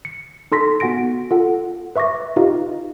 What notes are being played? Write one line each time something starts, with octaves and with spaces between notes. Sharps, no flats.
C#7
D#4 A4 C6 A#6 B6
B3 F#4 F#5 G#5 A#6 D7
F4 A4 F#5
B4 E5 C#6 D6 A#6
D#4 F4 G4 B4 D#5 F5